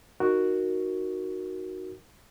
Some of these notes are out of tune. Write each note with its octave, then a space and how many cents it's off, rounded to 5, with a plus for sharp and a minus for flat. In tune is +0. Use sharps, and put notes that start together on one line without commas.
D#4 +0 F#4 +0 A#4 +0